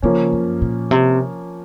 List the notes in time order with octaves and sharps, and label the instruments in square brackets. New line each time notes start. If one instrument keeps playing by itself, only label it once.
[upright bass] C#3 [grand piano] F3 A#3 C#4
[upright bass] F#2
A#2
C3